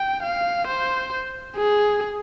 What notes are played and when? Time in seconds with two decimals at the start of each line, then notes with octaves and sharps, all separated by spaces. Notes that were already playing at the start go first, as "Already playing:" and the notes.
Already playing: G5
0.24 F5
0.68 C5
1.56 G#4